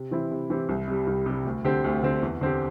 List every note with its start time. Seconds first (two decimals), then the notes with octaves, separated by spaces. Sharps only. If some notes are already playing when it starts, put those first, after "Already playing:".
Already playing: C3
0.11 E3 C4 E4 G4
0.31 C3
0.50 E3 C4 E4 G4
0.69 C2
0.88 C3 G3
1.07 C2
1.26 C3 G3
1.45 D2
1.64 D3 C4 G4
1.84 D2
2.03 D3 C4 G4
2.22 E2
2.41 D3 C4 G4